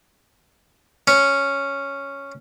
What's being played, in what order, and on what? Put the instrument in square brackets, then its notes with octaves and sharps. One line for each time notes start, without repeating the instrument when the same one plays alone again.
[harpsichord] C#4